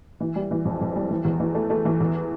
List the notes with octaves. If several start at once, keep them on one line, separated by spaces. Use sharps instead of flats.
E3
G3
E3
F2
F2
G3
E3
E2
E3
A3
A3
E3
E2